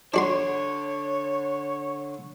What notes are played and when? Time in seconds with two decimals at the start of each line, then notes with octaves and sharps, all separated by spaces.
0.14 D3 D4 F#4 C#5 C6